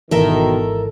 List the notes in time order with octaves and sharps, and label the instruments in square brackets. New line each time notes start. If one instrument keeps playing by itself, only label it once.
[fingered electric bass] G#1 C#2 E3 [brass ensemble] B2 D#3 [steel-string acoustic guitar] A4 A#4 E5